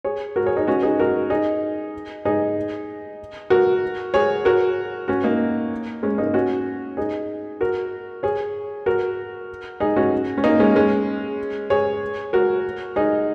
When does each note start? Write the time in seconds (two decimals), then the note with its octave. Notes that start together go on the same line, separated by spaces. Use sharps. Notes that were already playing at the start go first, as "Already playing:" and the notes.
0.04 G#4 C#5
0.36 F#4 A#4
0.46 G#4 C#5
0.57 D#4 G#4
0.67 C#4 F#4
0.83 D#4 G#4
1.00 F#4 A#4
1.30 D#4 G#4
2.25 D#4 G#4
3.50 F#4 A#4
4.14 G#4 C#5
4.45 F#4 A#4
5.08 C#4 F#4
5.24 A#3 D#4
6.03 G#3 C#4
6.18 A#3 D#4
6.34 C#4 F#4
6.97 D#4 G#4
7.61 F#4 A#4
8.23 G#4 C#5
8.86 F#4 A#4
9.80 D#4 G#4
9.96 C#4 F#4
10.38 C#4
10.44 A#3 D#4
10.60 G#3 C#4
10.76 G#3 C#4
11.70 G#4 C#5
12.33 F#4 A#4
12.96 D#4 G#4